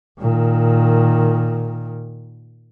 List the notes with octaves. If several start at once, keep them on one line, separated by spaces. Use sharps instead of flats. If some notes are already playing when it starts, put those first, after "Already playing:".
A#2 D#3